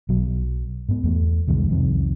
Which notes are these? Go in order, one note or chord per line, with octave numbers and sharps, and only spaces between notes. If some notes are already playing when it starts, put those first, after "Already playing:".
B1 F#3
G#2 B3
E2 A3
C2 F2 D#3 G#3
C2 F2 C3 D#3